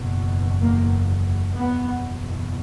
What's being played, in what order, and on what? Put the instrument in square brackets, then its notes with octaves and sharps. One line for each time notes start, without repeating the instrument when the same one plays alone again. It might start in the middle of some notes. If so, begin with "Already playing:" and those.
Already playing: [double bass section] F#1 E2 B2
A#3
F#1 E2 B2 B3